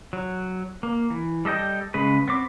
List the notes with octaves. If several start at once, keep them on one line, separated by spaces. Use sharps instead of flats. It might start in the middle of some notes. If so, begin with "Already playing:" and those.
F#3
A#3
E3
G3 A4 D#5 G5
C#3 G#3 B4
B3 C4 D6